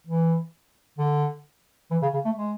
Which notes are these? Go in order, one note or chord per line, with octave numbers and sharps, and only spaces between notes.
E3
D3
E3
C#3
C#3
A3
G#3